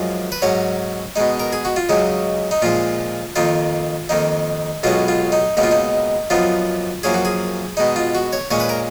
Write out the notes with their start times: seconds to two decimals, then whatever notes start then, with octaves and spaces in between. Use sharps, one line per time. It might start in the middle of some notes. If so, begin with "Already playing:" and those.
Already playing: F#2 F3 G#3
0.32 B4
0.42 G#2 F#3 C#4 C#5
1.16 B2 G#3 D#4
1.40 A#4
1.53 G#4
1.65 F#4
1.76 F4
1.89 C#2 C#3 F#3 D#4
2.51 D#4
2.62 A#2 F3 G#3 F4
3.36 F2 D#3 A#3 D#4 F4
4.09 F2 D#3 A#3 D#4
4.83 B1 B2 G#3 C#4 F4
5.08 F4
5.32 D#4
5.57 C#2 B2 A#3 D#4
5.63 F4
5.71 D#4
6.30 F#2 F3 B3 D#4 F4
7.03 F#2 F3 A#3 C#4 G#4
7.14 F#4
7.25 G#4
7.77 B2 G#3 D#4
7.96 F4
8.15 F#4
8.33 C#5
8.51 A#2 G#3 C#4 C#5
8.60 B4
8.69 A#4